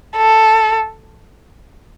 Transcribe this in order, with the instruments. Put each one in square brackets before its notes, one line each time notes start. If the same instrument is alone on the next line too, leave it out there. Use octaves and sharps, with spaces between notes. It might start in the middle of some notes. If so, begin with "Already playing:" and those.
[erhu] A4